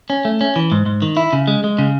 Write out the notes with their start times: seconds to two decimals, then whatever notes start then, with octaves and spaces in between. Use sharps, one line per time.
0.10 C#4
0.25 A3
0.41 C#4
0.56 E3
0.72 G#2
0.86 G#2
1.02 D#3
1.17 E4
1.33 C#3
1.47 G#3
1.64 G#3
1.79 C#3